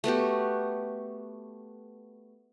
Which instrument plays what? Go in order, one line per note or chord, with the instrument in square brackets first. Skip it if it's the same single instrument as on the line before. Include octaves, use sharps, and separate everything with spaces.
[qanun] A3 B3 F#4 G4